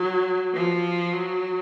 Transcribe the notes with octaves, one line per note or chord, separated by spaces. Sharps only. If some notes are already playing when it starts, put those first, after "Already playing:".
Already playing: F#3
F3
F#3